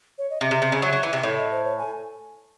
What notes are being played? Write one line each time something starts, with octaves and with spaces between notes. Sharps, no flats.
C#5
D#5
C3 E5
C3
C3
C#3
F#3
F#3
E3
C3
A2 C#5
D#5
C5
C#5
G#5